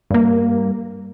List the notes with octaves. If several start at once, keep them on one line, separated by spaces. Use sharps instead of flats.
G2 A#3